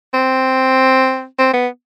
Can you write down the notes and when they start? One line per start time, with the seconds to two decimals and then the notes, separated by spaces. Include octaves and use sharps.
0.14 C4
1.38 C4
1.53 B3